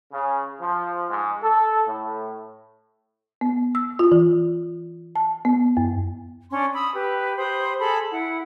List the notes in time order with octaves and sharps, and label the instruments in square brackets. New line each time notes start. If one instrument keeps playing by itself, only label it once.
[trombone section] C#3
F3
G#2
A4
A2
[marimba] B3
E6
F4
E3
A5
B3
F#2
[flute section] C#4 D4 C6
B5 D#6 E6
G4 B4
G4 C5 B5 D#6
G#4 A4 B5 C6
E4 F#5